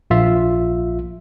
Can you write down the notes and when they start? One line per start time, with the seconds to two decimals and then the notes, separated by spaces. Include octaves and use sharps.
0.10 A#1 F4 E5